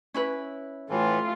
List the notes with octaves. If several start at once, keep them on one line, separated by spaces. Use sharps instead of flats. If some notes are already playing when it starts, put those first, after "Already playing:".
C#4 E4 B4
A2 E3 A3 F4